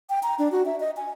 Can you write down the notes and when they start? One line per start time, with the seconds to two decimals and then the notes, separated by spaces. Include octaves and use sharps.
0.10 G5
0.23 A#5
0.39 D4
0.52 F#4
0.66 E5
0.80 D#5
0.97 G#5